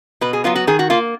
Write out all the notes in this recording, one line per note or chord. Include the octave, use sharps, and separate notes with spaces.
B2 B4
G#4
F#3 B3 F4
F#4
D#3 G#4
F#4
A#3 F4